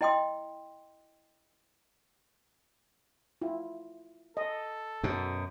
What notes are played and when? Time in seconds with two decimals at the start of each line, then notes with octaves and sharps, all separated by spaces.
0.01 E4 D#5 G5 C6 D#6
3.42 E4 F4
4.37 A4 D#5
5.03 F#2 B2